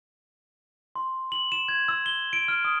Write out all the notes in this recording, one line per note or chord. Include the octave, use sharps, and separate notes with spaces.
C6
F#7
E7
G#6
E6
G7
D7
F6
D#6